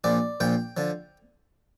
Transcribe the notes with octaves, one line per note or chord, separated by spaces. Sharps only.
A#1 A#2 F3 D5
A#1 A#2 F3 G5
D3 F3